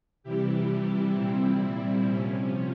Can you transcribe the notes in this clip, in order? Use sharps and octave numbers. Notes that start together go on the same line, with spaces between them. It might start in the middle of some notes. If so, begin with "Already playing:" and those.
C3 E3 G3 E4 G4
A#2 G3 C4 E4
C4
C3 F3 C#4